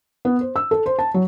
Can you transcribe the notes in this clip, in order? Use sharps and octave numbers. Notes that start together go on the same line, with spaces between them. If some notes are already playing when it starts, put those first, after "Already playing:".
B3
C5
E6
A4
C5
A5
F#3